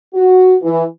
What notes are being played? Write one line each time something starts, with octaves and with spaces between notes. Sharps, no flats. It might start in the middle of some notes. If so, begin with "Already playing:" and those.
F#4
E3